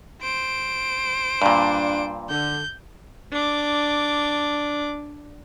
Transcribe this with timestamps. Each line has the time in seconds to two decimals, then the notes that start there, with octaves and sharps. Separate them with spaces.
0.22 C5 D7
1.42 G2 A#2 D4
2.29 D3 G6
3.32 D4 D6